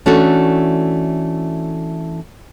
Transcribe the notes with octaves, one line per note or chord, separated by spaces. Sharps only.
E3 A3 C#4 D4 F#4 A4